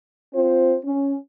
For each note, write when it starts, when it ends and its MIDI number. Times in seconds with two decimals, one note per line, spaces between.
0.33 0.75 60
0.33 0.75 65
0.33 0.75 72
0.85 1.16 61